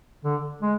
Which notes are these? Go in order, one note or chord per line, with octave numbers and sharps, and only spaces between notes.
D3
G#3